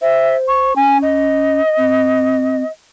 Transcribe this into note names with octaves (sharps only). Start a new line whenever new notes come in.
C5 E5
C#6
C#4 G#5
D#5
C4